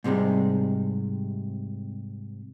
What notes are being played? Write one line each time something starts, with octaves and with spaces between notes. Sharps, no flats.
G#2 C3 E3 G3 G#3